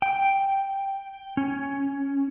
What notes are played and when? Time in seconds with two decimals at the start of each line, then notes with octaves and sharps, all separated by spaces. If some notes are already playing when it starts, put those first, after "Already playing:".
0.02 G5
1.37 C#4